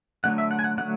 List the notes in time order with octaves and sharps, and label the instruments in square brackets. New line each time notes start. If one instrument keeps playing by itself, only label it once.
[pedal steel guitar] D3 F#3 A3 D4 F#5
E5
F#5
G#5
F#5
D3 F#3 A3 F#5